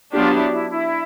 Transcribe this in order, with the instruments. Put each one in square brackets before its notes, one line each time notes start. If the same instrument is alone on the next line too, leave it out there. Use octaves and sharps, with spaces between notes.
[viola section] F#3 B3 D4 G4 [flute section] F4
[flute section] E4
E4
E4